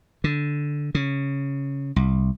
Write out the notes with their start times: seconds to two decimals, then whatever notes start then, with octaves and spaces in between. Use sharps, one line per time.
0.24 D3
0.95 C#3
1.96 C2